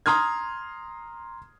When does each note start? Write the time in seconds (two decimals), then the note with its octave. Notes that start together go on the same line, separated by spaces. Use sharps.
0.06 A#5 C6 D#6 F6 G#6